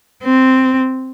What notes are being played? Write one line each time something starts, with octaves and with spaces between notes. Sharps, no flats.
C4